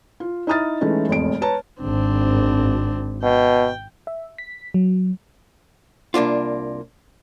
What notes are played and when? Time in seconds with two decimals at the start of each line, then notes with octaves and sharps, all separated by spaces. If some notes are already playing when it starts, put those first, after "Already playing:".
0.20 F4
0.47 D#4 E4 A#5 D#6 F6 A6
0.81 E3 G#3 A3 C#4 D#4
1.08 E1 A1 F2 D7
1.41 B4 C#5 A5 A#5
1.82 G#1 C4 D4
3.23 B2 G5
4.07 E5
4.38 B6
4.74 F#3
6.14 C2 A#3 D4 F4